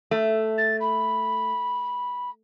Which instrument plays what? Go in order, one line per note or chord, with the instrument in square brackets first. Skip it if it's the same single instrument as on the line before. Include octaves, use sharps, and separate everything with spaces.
[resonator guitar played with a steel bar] A3
[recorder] A6
B5